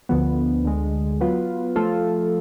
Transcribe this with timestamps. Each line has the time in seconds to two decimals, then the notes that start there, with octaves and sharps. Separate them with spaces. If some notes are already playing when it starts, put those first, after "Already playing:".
0.09 D2 D3 F3 B3
0.64 D2 D3 G#3
1.21 F#3 B3 F4 B4
1.76 F3 A3 F4 A4